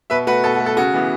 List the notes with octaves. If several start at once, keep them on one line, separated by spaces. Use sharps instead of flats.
B2 B4 E5
A3 F#4 B4
B2 A4
F#4
A3
A4
C#3 F#4
E3 B3